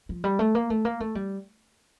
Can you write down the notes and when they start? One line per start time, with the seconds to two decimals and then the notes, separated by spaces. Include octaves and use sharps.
0.09 F3
0.24 G3
0.39 A3
0.55 A#3
0.70 A3
0.85 A#3
1.00 A3
1.15 G3